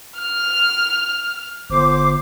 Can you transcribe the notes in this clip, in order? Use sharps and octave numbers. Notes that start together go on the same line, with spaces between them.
F6
G1 C5 D6